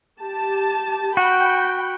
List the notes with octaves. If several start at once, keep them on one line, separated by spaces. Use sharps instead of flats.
G4 A5
F#4 G5 B5